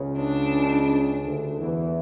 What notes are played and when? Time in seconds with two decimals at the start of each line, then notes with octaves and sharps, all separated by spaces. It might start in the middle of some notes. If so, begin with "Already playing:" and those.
Already playing: C#2 C#3
0.18 D4
1.24 D2 D3
1.60 E2 E3